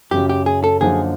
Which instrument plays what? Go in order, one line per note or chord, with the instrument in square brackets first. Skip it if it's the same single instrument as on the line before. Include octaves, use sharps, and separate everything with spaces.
[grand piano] F#2 C#3 F#3 [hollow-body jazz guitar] G4
[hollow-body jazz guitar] G4
G#4
A4
[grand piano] F#2 D3 F3 A#3 D#4 [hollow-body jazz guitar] G#4